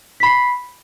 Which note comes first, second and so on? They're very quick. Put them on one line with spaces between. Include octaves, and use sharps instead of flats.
B6 B5 C7